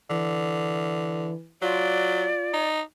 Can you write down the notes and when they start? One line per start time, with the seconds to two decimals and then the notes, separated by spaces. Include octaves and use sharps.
0.10 D3 E3
1.62 F#3 F4 D5
2.54 D#4